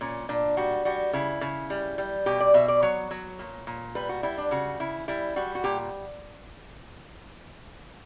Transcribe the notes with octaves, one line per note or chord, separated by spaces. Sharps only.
A#2 C#4
A#2 D4
G3 F#4
G3 F#4
C#3 E4
C#3
G3
G3
B2 G4
D5
B2 E5
D5
F#3 C#5
F#3
A#2
A#2
G3 B4
F#4
G3 E4
D4
C#3 F#4
C#3 E4
G3 E4
G3 F#4
F#4
A#2 G4